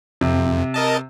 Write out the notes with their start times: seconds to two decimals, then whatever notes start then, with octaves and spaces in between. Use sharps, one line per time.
0.21 F2 C3
0.74 A#4 D#5 A5